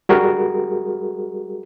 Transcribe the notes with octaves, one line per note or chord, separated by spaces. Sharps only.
G3 F#4 G#4 A#4